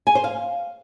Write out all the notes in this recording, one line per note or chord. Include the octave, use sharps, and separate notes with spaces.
G#5
C5
F5